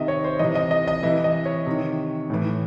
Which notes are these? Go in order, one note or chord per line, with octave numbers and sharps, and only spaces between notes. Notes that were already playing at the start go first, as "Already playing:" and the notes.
Already playing: C3 D#3 D#5 E5
C#5
C5
C3 E3 D#5
D#5
D#5
D#5
C3 E3 E5
D#5
C#5
C3 D#3
A2 E3